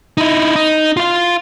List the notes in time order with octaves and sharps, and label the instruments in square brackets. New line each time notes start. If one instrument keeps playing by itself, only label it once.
[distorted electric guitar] D#4 E4
D#4
F4 F5